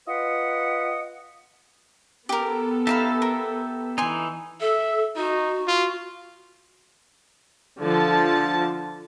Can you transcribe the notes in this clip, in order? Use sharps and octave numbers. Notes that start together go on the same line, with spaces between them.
F4 B4 D#5 F#5
B3 G4 A4 A#4
D#4 G4 E5 F5 A5 B5
A#4
E3 D#4 G#5 C6
A4 E5
D#4 F#4
F4
D3 F3 A5